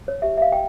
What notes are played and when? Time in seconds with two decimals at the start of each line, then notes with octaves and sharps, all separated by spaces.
0.08 C#5
0.22 G4 C#5 E5
0.37 E5
0.42 F5
0.52 G5